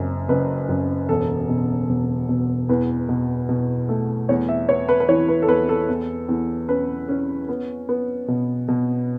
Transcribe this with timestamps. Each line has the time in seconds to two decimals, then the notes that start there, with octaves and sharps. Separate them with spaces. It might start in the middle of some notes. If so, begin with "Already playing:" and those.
Already playing: F#1 F#2
0.29 F#1 B4
0.69 F#2
1.09 E1 A4
1.49 B2
1.89 E1
2.29 B2
2.69 E2 B4
3.09 B2
3.49 B2
3.89 A3
4.29 E2 C#5
4.48 E5
4.69 B3 C#5
4.89 B4
5.00 B4
5.09 E3 C#5
5.28 B4
5.42 A4
5.48 E2 B4
5.69 A4
5.89 E2
6.29 E2
6.69 C#4 B4
7.09 C#4
7.49 B3
7.89 B3
8.28 B2
8.68 B2